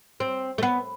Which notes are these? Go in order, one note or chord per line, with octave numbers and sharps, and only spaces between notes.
C4
A3
B3